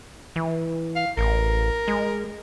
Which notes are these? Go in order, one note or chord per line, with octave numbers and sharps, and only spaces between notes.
E3
F5
A1 A#4
G#3